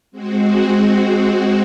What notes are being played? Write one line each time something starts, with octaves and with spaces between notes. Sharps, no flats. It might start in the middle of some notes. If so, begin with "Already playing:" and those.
G#3 C4 F#4